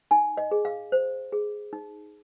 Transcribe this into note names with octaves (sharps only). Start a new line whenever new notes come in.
D#4 G#5
D#5
G#4
F5
C5
G#4
D#4